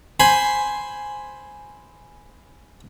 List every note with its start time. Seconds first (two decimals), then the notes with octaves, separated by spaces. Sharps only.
0.20 C5 G#5 B5